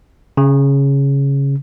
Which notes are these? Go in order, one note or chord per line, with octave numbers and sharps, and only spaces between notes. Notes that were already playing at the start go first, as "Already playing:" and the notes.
C#3